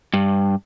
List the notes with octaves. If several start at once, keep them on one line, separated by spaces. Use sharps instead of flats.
G2